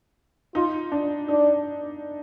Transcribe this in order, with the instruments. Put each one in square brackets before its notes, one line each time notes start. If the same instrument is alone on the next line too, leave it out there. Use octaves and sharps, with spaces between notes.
[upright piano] D#4 [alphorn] F4
[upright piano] D4
[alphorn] D4 [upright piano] D#4